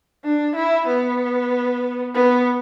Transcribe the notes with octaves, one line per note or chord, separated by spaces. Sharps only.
D4
E4
B3
B3